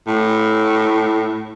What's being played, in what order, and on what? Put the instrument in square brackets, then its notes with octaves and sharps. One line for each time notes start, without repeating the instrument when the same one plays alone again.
[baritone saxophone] A2